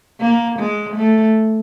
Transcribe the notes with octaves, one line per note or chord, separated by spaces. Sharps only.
A#3
G#3
A3